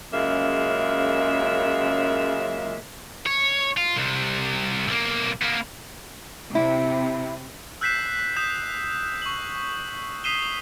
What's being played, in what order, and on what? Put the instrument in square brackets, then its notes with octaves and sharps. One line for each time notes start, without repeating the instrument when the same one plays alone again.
[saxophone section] F#2 C#3 G#3 A#3 F4 E5
[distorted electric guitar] C#5
F4
C2 C3
B1 A#3
A#3 B3
[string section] C3 [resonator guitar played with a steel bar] E4
[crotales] E6 F#6 G6 B6 C7 E7
D#6 G6 B6 E7
C#6 F#7
D#6 B6 C7 D#7 E7 G7